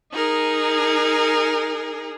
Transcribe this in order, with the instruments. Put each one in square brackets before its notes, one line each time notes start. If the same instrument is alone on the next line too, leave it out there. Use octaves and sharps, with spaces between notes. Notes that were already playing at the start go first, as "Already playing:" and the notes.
[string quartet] D#4 G#4 A#4